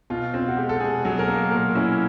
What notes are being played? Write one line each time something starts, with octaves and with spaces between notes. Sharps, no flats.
B2 F4
C4 F4
F#4
G#3 G4
A4
B2 G#4
F#3 G#4
A#4
A#3 A4
A#2 A#4
C#4 E4